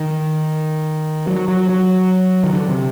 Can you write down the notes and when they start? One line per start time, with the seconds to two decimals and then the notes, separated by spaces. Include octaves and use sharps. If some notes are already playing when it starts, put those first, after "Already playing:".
Already playing: D#3
1.27 F#3
1.48 F#3
1.69 F#3
2.44 D#3
2.53 D3
2.69 C3